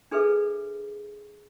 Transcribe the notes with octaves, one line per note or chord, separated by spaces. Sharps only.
D4 G#4 A4 B4 E5